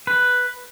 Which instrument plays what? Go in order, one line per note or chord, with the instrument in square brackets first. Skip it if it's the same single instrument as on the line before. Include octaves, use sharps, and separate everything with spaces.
[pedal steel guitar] B4